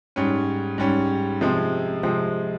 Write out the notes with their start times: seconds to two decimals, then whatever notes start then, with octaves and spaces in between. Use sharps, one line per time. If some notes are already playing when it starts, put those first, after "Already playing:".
0.16 G#2 G3 C#4
0.78 G#2 G3 C#4
1.41 C3 F3 G#3 C4
2.03 C3 F3 G#3 C4